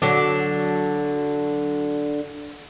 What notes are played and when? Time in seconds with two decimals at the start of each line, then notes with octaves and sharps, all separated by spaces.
0.02 D3 F#3 D4